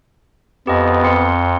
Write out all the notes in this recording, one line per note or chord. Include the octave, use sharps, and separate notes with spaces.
F2 B3 G4 D#5
C4 C6 C#7